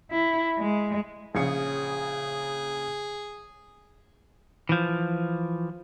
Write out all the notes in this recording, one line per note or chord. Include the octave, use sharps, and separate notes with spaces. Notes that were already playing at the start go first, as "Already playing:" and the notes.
E4
G#3
A#1 C#3 G#4 C#7
E3 F3